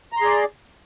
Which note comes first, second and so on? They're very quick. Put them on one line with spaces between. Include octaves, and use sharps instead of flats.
A#5 C6 G#4 D5